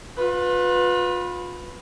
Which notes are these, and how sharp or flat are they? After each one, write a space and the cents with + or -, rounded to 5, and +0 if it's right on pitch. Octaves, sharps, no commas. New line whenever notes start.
F4 +35 B4 +0